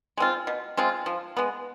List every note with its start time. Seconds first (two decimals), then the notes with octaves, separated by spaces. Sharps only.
0.17 G#3 C4 F4
0.47 B2
0.77 G#3 C4 F4
1.06 F3
1.37 G#3 B3